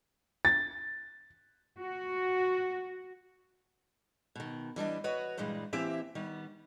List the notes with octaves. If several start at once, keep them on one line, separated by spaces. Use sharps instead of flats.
A6
F#4
B2 D#3
E3 G3 D4 D#5
F#4 B4 C#5 D#5
G2 A#2 E3 G3 G#3
E3 A#3 C4 E4 G4 E5
D#3 G3 B3